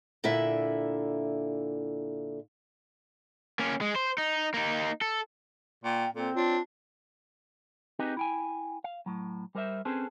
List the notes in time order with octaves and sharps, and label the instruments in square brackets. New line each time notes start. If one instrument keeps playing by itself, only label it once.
[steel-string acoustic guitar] A#2 D3 E4 E5
[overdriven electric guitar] A#3 C#4
G#3
C5
D#4
A#3 D#4
A4
[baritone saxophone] A#2 [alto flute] G5
[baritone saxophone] A#2 [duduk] C4 [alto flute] A4
[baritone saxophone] D4 [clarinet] F4 [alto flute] C#5
[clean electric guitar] C4 D#4 G4 G#4 B4 D#5
E4 G5 G#5
F5
A2 F#3
G3 A#4 C5 D5 E5
C4 C#4 G#4 A4 B4 C5